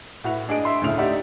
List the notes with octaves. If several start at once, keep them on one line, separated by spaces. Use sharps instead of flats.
A2 F#4 B4 F7
D4 G#4 D#5 D7
E5 C6
D2 A2 C#3 A3 F7
D#4 G4 D5 E5 F#5